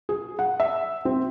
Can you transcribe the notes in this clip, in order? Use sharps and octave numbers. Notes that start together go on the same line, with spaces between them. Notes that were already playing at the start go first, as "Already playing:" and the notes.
G#4
F#5
E5
C4